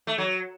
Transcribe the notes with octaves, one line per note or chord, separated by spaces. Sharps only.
A3
F#3